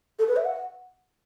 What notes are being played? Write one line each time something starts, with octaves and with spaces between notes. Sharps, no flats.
A4
B4
E5
F#5